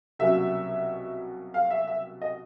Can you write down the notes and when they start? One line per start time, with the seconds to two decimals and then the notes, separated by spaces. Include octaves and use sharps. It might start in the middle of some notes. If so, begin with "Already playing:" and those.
0.19 C2 B2 F#3 A#3 C#4 E5
1.54 F5
1.71 E5
1.87 E5
2.22 D#5